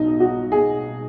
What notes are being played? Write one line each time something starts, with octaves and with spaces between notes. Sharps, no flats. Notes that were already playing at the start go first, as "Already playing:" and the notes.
Already playing: B1 B2 D#4
F#4
G#4